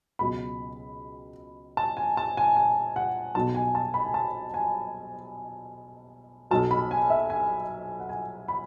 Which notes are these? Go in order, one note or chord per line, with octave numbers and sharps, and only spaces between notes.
C#2 B2 F#3 B5
A5
G#5
A5
G#5
G#5
F#5
B1 B2 F#3 A5
G#5
A5
B5
G#5
A5
G#5
B1 B2 F#3 A5
B5
G#5
E5
G#5
F#5
G#5
B5